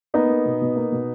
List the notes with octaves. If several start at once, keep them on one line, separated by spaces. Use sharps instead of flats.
A#3 B3 D#4
A#3
B2
B2
A#3
B2